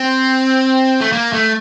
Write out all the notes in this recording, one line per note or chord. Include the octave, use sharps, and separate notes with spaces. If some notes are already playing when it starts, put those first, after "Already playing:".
Already playing: C4
A3
A#3
A3